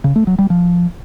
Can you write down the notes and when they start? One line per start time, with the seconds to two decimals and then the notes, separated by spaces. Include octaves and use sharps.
0.04 C#3
0.16 A3
0.27 F#3
0.39 G3
0.50 F3